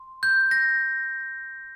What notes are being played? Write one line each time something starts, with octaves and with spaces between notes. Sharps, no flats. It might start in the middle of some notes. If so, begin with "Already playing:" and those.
Already playing: C6
G6
A#6